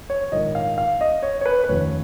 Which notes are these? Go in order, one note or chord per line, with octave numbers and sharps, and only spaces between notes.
C#5
A#1 G#2 D#3 A#3 D#5
F5
F5
D#5
C#5
C#5
B4
B4
F1 D#2 C#3 F3 C#5